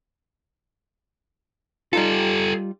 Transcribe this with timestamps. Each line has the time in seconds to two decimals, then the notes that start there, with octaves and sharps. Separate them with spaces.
1.93 G3 D#4 F4 G4 A4